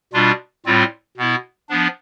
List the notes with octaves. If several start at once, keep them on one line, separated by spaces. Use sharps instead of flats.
B2 G3 D4 F4
A2 G3 C4 F4
B2 B3 E4
F3 B3 D4